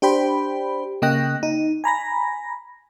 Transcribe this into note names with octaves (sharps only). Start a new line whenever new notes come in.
D4 G4 C5 G5 B5
C#3 A#3 D#5 G5 F#6 A#6
D#4
G#5 A#5 B5 A#6